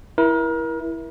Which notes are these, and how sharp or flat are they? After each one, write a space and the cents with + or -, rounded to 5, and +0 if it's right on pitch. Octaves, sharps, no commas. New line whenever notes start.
E4 +0 A#4 +35